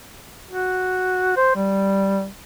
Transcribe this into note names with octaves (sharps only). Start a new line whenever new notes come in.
F#4
C5
G3